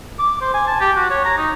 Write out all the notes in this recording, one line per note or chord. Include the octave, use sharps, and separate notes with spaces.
D6
C5
G#5
A5
G4
F#4
C#5
A#5
D#4